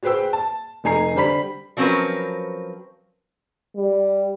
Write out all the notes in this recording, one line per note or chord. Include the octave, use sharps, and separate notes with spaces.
F#4 G#4 B4 C5 G5 E6
A5
F1 A3 D#4 G#5 A#5 C7
D3 G3 C5 B5 B6
F3 F#3 C4 C#4 A#4 B4
G3